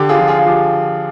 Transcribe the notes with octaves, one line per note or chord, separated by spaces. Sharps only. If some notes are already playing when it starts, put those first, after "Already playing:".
Already playing: D3 G4
F4 G#4
F3
F4 G#4
F4
F3 G4